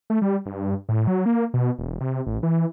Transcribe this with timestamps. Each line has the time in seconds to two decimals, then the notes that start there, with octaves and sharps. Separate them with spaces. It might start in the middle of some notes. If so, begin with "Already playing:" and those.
0.10 A3
0.22 G3
0.46 G2
0.89 A2
1.07 F#3
1.26 A#3
1.54 B2
1.79 E1
2.01 C3
2.26 A1
2.43 E3